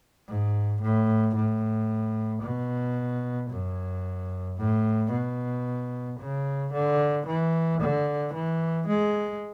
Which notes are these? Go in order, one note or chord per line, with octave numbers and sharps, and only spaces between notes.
G#2
A2
A2
B2
F#2
A2
B2
C#3
D3
E3
D3
E3
G#3